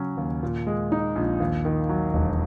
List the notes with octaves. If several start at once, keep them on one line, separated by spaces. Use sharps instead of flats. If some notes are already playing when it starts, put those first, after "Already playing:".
Already playing: C#3 F#3 C#4
D#2
A#2
G#3
D#4
A#1
D#2
D#3
F#3
E1